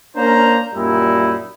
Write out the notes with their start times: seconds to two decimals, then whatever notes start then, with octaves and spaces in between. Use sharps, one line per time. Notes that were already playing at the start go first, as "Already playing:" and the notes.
0.15 A#3 C#4 D4 C5 A#5
0.73 F#2 A#2 G3 D#4 E4